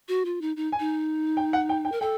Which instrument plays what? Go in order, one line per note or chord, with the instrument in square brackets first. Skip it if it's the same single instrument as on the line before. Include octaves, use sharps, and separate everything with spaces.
[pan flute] F#4
F4
D#4
D#4
[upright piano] G#5
[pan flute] D#4
[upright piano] G5
F#5
G5
G5
[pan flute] A#4
[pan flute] A4 [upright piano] G5